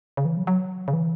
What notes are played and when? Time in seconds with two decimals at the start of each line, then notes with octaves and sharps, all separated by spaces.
0.17 C#3
0.25 E3
0.37 F#3
0.47 F#3
0.88 C#3
0.93 E3